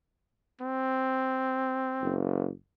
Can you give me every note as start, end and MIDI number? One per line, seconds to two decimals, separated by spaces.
0.61 2.17 60
2.01 2.49 30